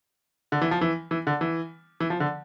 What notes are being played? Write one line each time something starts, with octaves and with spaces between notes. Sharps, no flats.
D3
E3
F3
E3
E3
D3
E3
E3
F3
D3